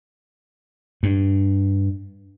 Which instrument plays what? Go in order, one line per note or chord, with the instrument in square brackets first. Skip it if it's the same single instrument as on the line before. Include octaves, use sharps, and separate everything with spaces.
[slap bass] G2